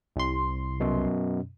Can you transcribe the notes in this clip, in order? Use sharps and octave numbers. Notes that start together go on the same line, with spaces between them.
C2 C6
F#2 B2